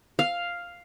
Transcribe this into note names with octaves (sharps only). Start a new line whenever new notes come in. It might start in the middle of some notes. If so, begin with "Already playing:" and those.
F5